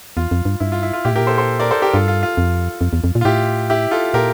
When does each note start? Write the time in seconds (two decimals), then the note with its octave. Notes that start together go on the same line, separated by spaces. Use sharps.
0.17 E2 F4
0.31 F2
0.45 G2
0.60 G2 E4
0.72 F4
0.83 E4
0.93 F4
1.05 A#2 E4 G4
1.12 A2
1.16 A#2 G4 A#4
1.27 A4 C5
1.38 A4 C5
1.60 A#4 D5
1.71 A4 C5
1.82 G4 A#4
1.93 G2 F4 A4
2.08 F4
2.23 F4
2.37 F2
2.81 F2
2.93 E2
3.04 F2
3.15 A#2
3.21 F4
3.25 A2 E4 G4
3.70 E4 G4
3.91 F4 A4
4.14 A#2 G4 A#4